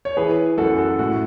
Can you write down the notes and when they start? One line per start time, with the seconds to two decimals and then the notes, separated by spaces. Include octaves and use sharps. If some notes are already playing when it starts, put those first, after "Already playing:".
0.05 C#5
0.17 E3 G#4 B4
0.58 F#2 F#4 A4
0.78 F#4 A4
0.99 A2 F#4